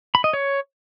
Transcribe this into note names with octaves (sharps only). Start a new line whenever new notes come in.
B5
D#5
C#5